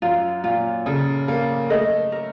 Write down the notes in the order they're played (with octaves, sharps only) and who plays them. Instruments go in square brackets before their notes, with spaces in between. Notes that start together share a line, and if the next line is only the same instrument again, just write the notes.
[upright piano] F#2 [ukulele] F4
[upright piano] A#2 [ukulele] F4
[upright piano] C#3 [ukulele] A4
[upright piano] A#3 [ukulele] A4
[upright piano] A3 [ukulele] D#5
[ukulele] A#4